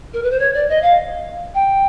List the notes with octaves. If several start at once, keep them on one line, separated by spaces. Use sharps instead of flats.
A#4
B4
C5
C#5
D5
D#5
F5
G5